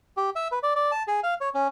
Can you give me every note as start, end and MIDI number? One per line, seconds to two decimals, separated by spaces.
0.17 0.30 67
0.36 0.48 76
0.52 0.59 71
0.63 0.73 74
0.76 0.91 74
0.92 1.03 81
1.08 1.20 68
1.23 1.34 77
1.41 1.49 73
1.54 1.67 61